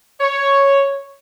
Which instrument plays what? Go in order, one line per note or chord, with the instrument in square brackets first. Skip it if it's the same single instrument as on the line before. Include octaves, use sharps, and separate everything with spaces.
[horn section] C#5